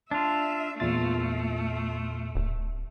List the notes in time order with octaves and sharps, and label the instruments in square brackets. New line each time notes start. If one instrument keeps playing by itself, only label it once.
[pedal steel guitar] D4 F4 [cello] E5
[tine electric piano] E2 A#2 A6 [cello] A3 [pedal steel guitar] F4
[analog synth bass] D1